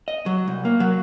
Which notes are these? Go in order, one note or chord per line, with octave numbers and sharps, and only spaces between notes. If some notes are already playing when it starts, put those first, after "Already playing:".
D#5
F#3
C2
A#3
F#3